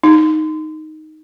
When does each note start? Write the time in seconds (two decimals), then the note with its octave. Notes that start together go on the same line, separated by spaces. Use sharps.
0.04 D#4